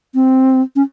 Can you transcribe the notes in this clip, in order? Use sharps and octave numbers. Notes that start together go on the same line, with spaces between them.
C4
C#4